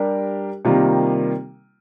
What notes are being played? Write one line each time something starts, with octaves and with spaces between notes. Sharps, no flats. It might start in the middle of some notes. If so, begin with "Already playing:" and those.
Already playing: G3 D4 G4 A#4
C3 D#3 G3 A#3 F4